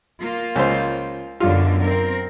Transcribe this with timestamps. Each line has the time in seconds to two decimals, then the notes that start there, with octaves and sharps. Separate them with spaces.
0.20 A#3 F4
0.56 C#2 C5
1.40 F#2 B2 D3 F4
1.81 C4 A#4